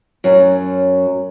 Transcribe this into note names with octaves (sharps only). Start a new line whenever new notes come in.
F#2 F#3